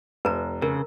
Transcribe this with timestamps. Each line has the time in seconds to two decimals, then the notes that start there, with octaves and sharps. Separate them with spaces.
0.25 F1 B4 A#5
0.62 C#3 A#4